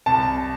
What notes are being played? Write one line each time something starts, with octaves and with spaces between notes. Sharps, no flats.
C2 A5